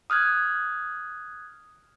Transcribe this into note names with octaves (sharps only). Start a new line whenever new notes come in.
D#6 F6 F#6 G#6